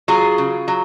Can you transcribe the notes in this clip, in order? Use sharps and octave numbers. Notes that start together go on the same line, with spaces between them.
F#3 F4 G#4
C#3
F#3